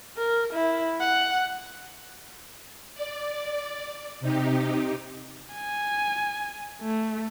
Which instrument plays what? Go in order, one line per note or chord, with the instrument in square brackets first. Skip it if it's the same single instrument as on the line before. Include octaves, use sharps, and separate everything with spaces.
[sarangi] A#4
E4
F#5
[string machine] D5
C3 D#4 G4
[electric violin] G#5
A3